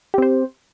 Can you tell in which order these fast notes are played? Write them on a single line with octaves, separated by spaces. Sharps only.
G4 C4 C5